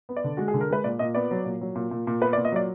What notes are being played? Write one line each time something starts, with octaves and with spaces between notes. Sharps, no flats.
B3
D5
D3
G#3 F#4
G#4
D3
A#4
G#3 B4
A#2 D5
A#2 D#5
B3 D5
F#3
A#2
F#3
A#2
A#2
A#2
B3 B4
D5
A#2
D#5
F#3 D5